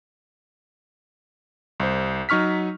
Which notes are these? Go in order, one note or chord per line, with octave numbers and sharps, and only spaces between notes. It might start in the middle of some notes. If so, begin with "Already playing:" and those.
C2 C5
F#3 D#4 C#6 F6 B6